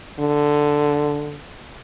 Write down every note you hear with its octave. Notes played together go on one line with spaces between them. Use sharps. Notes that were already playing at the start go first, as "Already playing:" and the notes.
D3